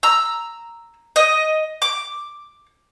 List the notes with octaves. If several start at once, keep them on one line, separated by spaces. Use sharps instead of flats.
A#5 E6
D#5
D6